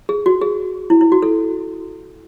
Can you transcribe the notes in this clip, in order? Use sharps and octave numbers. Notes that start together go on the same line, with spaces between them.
G#4
F#4
G#4
E4
E4
F#4
A4